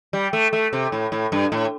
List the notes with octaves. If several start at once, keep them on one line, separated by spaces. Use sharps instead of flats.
G3
A3
A3
C3
A2
A2
G2
A2